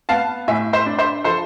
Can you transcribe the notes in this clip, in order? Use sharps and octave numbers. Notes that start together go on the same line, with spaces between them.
B3 F5 A5
A2 E5 G#5
C5 E5
D4
C5 E5
F3 A4 C5